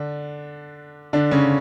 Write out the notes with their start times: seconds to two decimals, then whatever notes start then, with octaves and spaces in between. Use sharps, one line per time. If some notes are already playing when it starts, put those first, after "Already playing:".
Already playing: D3 D4
1.13 D3 D4
1.31 C#3 C#4